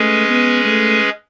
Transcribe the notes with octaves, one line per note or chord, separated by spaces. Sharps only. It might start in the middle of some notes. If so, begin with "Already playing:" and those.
Already playing: G#3 A3 C#4 G#4 B4
B3
A3